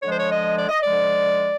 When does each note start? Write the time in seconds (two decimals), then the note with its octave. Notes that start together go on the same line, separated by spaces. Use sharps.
0.02 D3 F3 G#3 C#5
0.11 C5
0.19 C#5
0.30 D#5
0.57 D5
0.69 D#5
0.80 D5
0.85 D3 F3 G#3